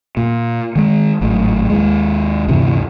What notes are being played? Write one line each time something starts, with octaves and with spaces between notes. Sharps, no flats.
A#2
D#3 G#3
G#1 A2 F#3
D#2 G#3
D2 G2 C3 E3